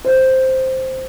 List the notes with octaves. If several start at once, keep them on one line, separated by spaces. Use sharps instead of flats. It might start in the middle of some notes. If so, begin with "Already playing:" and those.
C5